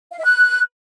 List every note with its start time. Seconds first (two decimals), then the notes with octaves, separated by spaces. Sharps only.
0.11 F5
0.18 E5
0.24 F#6